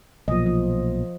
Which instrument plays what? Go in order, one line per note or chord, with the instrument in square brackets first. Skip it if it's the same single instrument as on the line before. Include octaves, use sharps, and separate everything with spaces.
[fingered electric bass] B1 A#2 [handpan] F3 D#5
[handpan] F3